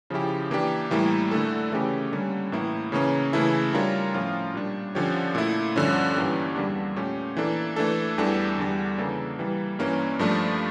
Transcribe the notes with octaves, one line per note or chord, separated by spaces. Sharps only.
C#3 F3 C#4 E4 G4
E3 A#3 D4 G4
A2 E3 G3 A#3 E4
D3 A3 E4 A4
C#3 E3 A3 C#4 G4
D3 G3 A#3 C#4
A2 E3 A#3 E4
C#3 E3 A#3 C#4
C#3 E3 A3 E4 A4
G3 D4 F4 A#4 C#5
A2 F3 C#4 F4 A#4
A#2 G3 D4
D3 F3 C#4 G4 C#5
A#2 A3 E4
G2 D3 F3 C#4
G2 E3 A#3 C#4 G4
E2 D3 G3 A#3 D4
A#2 A3 C#4 G4
E3 A#3 D4 A4
E3 A3 D4 A4
E2 E3 G3 D4 A4
E2 D3 G3
C#3 E3 A#3 D4 A4
E3 G3 A#3
G2 E3 A#3 C#4
G2 F3 A3 D4